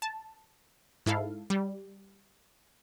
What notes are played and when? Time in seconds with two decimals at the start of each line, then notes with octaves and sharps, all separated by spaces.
0.02 A5
1.06 G#2 E4 A4 F5
1.50 G3